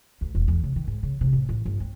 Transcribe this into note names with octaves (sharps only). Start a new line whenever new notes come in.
D2
E1
E2
C#3
D#3
G#2
C#3
C3
A2
A1
G1
C4